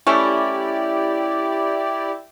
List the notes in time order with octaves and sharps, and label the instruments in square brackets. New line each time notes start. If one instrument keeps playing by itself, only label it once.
[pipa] A3 C#4 [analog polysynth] E4 G4 D5